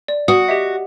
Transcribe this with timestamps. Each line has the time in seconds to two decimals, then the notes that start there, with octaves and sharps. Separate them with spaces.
0.08 D5
0.28 F#4 D#6
0.48 G4 D#5 E5